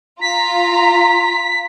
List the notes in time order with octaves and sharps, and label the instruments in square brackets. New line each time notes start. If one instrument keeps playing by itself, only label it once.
[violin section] F4 A#5 [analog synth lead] B6